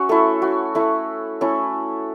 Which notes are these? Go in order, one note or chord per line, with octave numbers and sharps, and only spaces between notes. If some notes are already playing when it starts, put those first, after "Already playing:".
Already playing: C#4 F#4 B4 C#5 E5
A3 E4 A4
F#4
A3 E4
A3 C#4 E4 A4